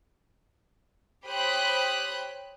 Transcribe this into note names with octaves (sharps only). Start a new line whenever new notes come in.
G4 C5 C#5 B5 D#6 F#6